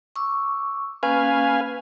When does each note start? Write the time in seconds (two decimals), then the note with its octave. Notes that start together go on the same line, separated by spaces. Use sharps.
0.16 C#6 D6 E6
1.03 A#3 C#4 B4 F5 G#5